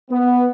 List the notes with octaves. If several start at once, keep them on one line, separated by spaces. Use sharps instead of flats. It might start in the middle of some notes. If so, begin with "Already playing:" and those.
B3